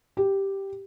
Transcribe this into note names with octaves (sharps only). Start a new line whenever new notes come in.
G4